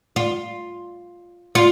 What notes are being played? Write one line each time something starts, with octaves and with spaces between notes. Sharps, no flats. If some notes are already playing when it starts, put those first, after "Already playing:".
F4
F4